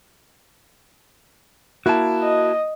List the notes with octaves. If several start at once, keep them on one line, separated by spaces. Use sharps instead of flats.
A#3 E4 F#4 A5
D#5